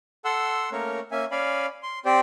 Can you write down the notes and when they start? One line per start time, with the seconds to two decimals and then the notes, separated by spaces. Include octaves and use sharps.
0.25 A4 F#5 C6 E6
0.72 A3 A#3 C#4 A#4 C#5
1.12 A#3 C#4 E5 G#5
1.31 C#4 D5 F5 G#5 B5
1.83 C6
2.05 C4 G4 C5 D5